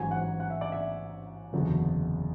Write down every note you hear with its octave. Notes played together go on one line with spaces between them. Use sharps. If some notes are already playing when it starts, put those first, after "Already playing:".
Already playing: A1 G#2 F#3 G#5
F#5
F#5
E5
D5
E5
F#1 E2 D3 F#3